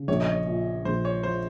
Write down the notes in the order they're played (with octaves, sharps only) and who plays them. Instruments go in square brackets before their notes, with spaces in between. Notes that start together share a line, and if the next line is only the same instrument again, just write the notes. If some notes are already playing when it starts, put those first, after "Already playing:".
Already playing: [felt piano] C#3
[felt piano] A#1 [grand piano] C#5
[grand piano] D#5
C#5
[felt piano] A#2
[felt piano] A#1 [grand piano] C5
[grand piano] C#5
[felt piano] F3 [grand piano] C5